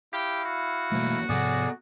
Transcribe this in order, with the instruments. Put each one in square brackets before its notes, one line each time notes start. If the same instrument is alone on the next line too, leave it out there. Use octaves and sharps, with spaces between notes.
[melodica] E4 F5 [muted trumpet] G4
[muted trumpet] F#4
[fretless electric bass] B2 G3 A3 [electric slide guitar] E3 F#3 A#3
[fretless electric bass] G#2 C3 F3 [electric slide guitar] B3 A4 F#5 [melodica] G#4 D5